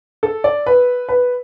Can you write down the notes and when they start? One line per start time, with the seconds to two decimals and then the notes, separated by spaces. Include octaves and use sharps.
0.23 A4
0.44 D5
0.66 B4
1.09 B4